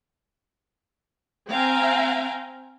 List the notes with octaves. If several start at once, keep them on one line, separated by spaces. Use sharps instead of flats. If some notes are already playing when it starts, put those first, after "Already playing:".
C4 F5 G5 G#5 A#5